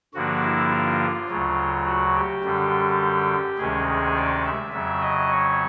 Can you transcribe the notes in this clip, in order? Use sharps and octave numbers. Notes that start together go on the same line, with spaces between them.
G2 D3 F3 A#3 D4 F#4
E4
F4
D2 C#3 F#3
F#4
G4
F#2 D3 G3
D2 C3 D#3 G#3 C#4 G#4
G#4
D5
E5
F2 C#3 F#3 E5
D#5
C#5